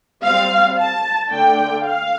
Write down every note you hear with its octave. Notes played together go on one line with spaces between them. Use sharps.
G3 C4 F5
A5
D3 A3 D4 G5
F5